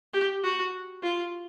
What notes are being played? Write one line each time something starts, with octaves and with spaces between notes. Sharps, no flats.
G4
F#4
F4